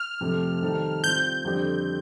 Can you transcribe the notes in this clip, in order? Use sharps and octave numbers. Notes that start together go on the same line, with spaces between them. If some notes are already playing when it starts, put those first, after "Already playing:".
Already playing: F6
F2 C3 F3 A3
D#3 G3 C4 D#4 A4
G3 C4 F4 G6
F2 D3 G3 C4 G4